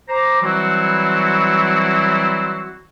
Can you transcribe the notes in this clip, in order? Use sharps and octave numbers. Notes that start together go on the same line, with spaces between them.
C5 A#5 D6
E3 F#3 G3 C4 E4 F#4